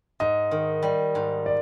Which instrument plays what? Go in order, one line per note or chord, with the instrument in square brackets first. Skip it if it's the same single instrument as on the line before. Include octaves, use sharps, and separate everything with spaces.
[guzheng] G#2 [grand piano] D#5
[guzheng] D#3
G3
G#2
[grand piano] D5